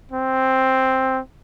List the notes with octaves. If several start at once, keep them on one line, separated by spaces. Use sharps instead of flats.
C4